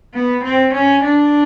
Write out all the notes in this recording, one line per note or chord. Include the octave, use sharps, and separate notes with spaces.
B3
C4
C#4
D4